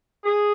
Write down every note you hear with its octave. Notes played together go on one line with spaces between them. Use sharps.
G#4